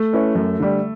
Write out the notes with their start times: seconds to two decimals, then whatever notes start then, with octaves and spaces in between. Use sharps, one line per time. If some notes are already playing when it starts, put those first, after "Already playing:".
Already playing: A3
0.13 C#4 E4 B4
0.35 F#2
0.60 D3 G3